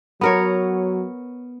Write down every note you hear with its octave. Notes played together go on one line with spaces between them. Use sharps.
F#3 B3 A#4 C#5